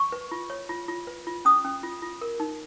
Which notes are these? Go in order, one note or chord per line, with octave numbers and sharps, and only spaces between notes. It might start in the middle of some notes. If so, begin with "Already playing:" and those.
Already playing: C#6
B4
F4
C#5
F4
F4
B4
F4
C#4 D#6
C#4
F4
F4
A#4
D#4